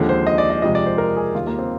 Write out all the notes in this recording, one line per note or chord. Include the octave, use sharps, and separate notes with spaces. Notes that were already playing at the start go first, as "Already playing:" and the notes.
Already playing: D#2 D3 F3 G#3
C5
D#5
D5
D#5
F2 C3 F3 G#3 D#5
D5
C5
A#4
G#4
D#2 D#3 G3 F4
A#3
C4